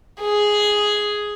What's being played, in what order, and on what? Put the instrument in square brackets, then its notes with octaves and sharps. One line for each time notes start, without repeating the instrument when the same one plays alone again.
[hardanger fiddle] G#4